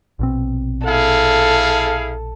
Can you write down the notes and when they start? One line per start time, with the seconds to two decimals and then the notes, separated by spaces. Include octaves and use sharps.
0.19 A#1 B2 C4
0.87 E4 G#4 A4 F5